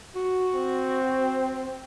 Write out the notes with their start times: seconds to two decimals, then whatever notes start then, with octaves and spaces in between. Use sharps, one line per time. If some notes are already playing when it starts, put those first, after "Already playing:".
0.16 F#4
0.54 C4